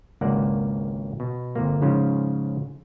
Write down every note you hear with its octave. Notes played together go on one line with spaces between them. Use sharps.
G#1 C#2 A#3 D5 F#5
B2
G1 C3 A#3
G#2 C#3 F3 C#4 F4